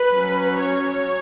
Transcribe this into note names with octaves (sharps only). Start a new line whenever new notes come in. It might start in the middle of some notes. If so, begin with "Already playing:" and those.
Already playing: B4
F#3 C#4
C#5